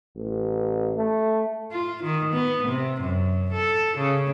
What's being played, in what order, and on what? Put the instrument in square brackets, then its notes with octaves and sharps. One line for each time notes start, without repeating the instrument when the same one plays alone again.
[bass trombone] A1
A3
[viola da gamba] F4
D#3
B3
C3
F#2
A4
C#3